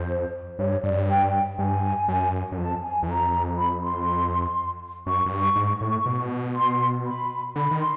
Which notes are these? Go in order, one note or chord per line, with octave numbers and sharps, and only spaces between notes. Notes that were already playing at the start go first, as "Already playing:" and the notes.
Already playing: F2 C5
G2 C#5
G2 D5
F#2
G2
G5
G2 G#5
F#2
F#2
F2 A5
G#5
E2
F2 A#5
B5
C6
F#2 C#6
F#2
G2 C#6
G#2
A2
B2
C6
B5
D3 B5
D#3
C6